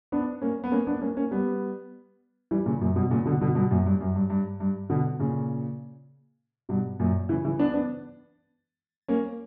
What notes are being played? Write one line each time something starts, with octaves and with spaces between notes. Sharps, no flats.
B3 D4
A#3 C#4
B3
A#3 C#4
B3 D4
A#3 C#4
A#3 C#4
G3 B3
E3 G3
A#2 C#3
F#2 A#2
G2 B2
A#2 C#3
B2 D3
B2 D3
G2 B2
F#2 A#2
G2
F#2
G2
G2
G2
B2 D3
A#2 C#3
G2 B2
F#2 A#2
C#3 E3
C#3 E3
B3 D4
B3 D4
A#3 C#4